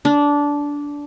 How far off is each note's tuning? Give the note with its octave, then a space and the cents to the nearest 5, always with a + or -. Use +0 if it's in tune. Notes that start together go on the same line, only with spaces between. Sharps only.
D4 -15